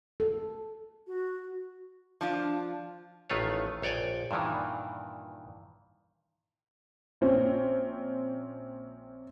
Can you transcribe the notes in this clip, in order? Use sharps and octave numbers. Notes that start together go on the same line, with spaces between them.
A4
F#4
F3 D4 F4
A1 D#3 A3 F4 B4 C#5
A#1 C#5 D5 G5 G#5
G2 A#2 D#3 E3
A#1 C4 C#4